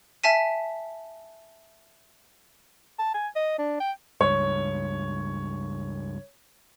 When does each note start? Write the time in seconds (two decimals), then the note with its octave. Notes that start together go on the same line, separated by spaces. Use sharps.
0.24 E5 G#5 A5 B6 D#7
2.99 A5
3.14 G#5
3.36 D#5
3.59 D4
3.80 G5
4.21 C#2 G2 C#5